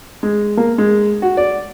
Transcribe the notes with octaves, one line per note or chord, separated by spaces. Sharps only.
G#3
A#3
G#3
F#4
D5